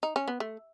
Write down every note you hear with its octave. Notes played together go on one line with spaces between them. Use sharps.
D#4
C#4
B3
A3